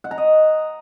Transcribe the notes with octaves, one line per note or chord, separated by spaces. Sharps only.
F#5
A#5
D#5